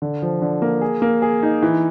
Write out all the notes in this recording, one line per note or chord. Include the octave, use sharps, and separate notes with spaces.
D3
F3
D3
A#3
G#4
A#3
G#4
D#4
E3